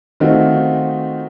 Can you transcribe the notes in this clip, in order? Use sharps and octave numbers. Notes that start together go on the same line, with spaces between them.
D#3 A3 C4 D#4 F4 F#4